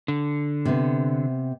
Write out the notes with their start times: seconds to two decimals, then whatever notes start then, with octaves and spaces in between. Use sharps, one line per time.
0.08 D3
0.65 C3 B3